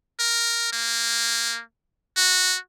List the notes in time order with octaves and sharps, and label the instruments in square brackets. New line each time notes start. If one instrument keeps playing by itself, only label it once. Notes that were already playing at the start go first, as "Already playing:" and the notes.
[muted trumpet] A#4
A#3
F#4